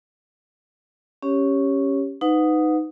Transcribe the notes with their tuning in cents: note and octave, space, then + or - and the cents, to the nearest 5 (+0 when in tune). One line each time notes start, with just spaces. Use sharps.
C#4 +0 G4 +0 C#5 +0
D#4 +0 B4 +30 F#5 -30